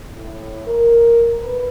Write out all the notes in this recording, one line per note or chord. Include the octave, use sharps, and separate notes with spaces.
A2
A#4
B4